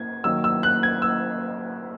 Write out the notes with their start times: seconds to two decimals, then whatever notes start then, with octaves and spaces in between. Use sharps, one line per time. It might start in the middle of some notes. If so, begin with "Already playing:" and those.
Already playing: A#3 G#6
0.24 D#3 F#3 A#3 E6
0.44 E6
0.63 F#6
0.83 G#6
1.02 E6